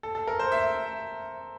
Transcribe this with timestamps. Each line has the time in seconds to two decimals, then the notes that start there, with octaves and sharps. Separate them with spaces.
0.03 A4
0.15 A4
0.27 A#4
0.39 C5
0.52 E5